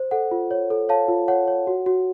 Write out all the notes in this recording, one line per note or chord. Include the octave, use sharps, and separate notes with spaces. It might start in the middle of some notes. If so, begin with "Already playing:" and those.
Already playing: C5
A4 F#5
F4
C#5
A4
C#5 F5 A5
F4
C#5 F#5
C#5
F#4
F#4